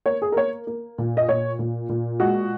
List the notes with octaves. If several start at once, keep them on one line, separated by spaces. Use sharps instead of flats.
A#3 C#5
G#4
A#4
A#3 C#5
A#3
A#2
D#5
A#2 C#5
A#2
A#2
G#3 F#4